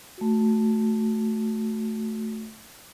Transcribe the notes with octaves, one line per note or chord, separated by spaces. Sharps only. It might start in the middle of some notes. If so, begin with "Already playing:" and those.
A3 F#4